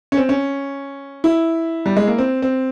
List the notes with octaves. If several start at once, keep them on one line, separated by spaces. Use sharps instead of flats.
C#4
C4
C#4
E4
G3
G#3
A#3
C4
C4